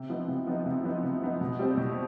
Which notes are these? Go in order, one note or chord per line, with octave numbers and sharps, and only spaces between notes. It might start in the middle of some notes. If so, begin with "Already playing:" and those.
Already playing: C3
F3 B3 D#4
C3
F3 B3 D#4
C3
F3 B3 D#4
C3
F3 B3 D#4
B2
G3 C4 G4
B2